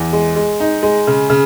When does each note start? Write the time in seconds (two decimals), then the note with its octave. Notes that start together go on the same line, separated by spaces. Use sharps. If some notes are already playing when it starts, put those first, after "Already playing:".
Already playing: E2
0.13 G#3
0.36 G#3
0.60 D#4
0.83 G#3
1.07 C#3
1.30 C#3